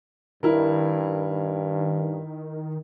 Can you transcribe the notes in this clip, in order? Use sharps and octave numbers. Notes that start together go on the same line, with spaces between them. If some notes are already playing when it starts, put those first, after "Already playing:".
G2 D#3 E4 A#4